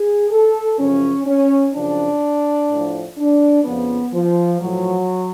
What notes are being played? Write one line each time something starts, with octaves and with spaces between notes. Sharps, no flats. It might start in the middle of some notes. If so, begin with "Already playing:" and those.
Already playing: G#4
A4
F#2 C#3 F3 C#4
C#4
F#2 C#3 F3 D4
A2 F3
D4
F2 C#3 F3 B3
F3
A2 F3 F#3